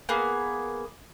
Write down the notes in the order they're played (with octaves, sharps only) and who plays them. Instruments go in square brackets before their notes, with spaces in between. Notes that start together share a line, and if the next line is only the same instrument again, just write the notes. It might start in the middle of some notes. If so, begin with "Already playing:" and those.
[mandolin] A#3 B3 G#4